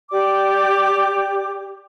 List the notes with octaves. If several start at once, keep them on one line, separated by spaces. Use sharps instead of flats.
G4 D5 D6